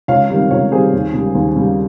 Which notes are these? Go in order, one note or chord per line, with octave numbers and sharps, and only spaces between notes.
C#2 C#5 F5
C3 D#3 G3
C#2 C#5 F5
C3 D#3 G3 G#4 C5
D#2
C#3 G3
D#2
C#3 G3